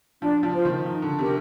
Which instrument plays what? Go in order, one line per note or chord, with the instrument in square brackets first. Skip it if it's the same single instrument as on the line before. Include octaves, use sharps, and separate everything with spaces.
[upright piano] F3 [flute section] D4
[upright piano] F3
[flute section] F4 C5
[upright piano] D#3
[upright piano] F3 [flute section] D#4
[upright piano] D3
[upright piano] C3 [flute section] G4 A#4